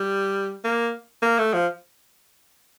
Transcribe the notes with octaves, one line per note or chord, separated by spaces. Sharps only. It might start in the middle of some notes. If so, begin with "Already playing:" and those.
Already playing: G3
A#3
A#3
A3
F3